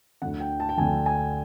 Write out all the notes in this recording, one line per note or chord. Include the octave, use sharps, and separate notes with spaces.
D2 D3 F#5
G5
A5
G5
D2 D3 G#5
G#5